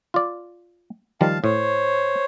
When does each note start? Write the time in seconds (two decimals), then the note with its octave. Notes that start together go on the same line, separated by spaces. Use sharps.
0.14 F4 D5
1.21 D#3 F3 G3 F5 A5
1.44 A2 C5 C#5